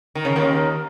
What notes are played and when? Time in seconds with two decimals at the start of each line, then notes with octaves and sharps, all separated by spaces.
0.15 D#3
0.25 C#3
0.36 D#2 D#3